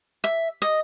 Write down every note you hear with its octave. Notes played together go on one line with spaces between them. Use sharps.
E5
D#5